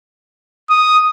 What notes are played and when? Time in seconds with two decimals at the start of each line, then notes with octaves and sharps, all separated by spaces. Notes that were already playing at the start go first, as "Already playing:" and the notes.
0.70 D#6